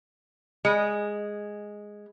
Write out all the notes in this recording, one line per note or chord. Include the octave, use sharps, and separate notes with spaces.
G#3